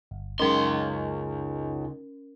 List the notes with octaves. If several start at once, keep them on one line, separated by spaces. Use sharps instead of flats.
G1
C#2 F#2 G#3 C#4 D#4 A#4 C6